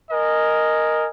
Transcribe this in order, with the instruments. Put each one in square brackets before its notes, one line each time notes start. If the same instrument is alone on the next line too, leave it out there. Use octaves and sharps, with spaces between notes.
[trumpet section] A#4 D#5 G#5